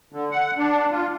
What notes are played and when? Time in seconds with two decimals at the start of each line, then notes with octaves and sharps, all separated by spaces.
0.12 D3
0.32 F#5
0.57 D4
0.91 F4